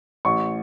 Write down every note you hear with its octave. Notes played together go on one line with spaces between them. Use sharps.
A1 C#6